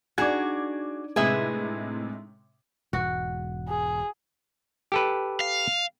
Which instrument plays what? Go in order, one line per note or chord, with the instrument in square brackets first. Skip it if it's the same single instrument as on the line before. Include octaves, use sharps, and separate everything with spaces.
[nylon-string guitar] D4 D#4 [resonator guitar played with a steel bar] F#4 G#4 [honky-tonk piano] D6 G#6
[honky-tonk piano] A2 C3 G#3 [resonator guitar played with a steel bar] G#4 B4 E5
[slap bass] E1 G#2 [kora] F#4
[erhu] G#4
[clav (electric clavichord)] G4 A4 B4
[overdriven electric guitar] F5